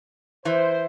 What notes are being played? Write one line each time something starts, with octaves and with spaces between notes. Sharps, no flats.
E3 C5